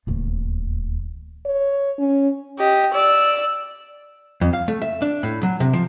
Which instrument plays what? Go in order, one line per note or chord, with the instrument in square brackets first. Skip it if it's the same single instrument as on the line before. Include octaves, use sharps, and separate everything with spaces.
[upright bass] D1 D#2
[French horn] C#5
C#4
[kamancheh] G4 D#5
D5 E6
[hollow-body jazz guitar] F2
F5
A3
E5
D4
A2
F#3
C3
F3